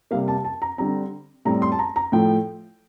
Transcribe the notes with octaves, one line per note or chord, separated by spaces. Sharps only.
C3 G3 A#3 F5
A5
A5
A#5
D3 G3 C4 A#5
A2 G3 C4 A#5
C6
A5
A#5
A#5
A2 F3 A3 G5